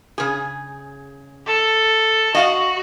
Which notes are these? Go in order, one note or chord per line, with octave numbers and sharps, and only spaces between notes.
C#3 G#4
A4
F#4 D#5 F5 F#5